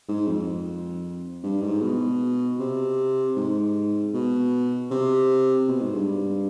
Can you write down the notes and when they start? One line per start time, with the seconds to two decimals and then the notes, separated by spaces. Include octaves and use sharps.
0.08 G#2
0.27 F2
1.43 G2
1.62 G#2
1.82 B2
2.59 C3
3.37 G#2
4.14 B2
4.91 C3
5.68 B2
5.82 G#2
5.94 G2